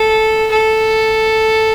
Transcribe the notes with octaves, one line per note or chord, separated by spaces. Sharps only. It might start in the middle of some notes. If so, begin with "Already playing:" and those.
Already playing: A4
A4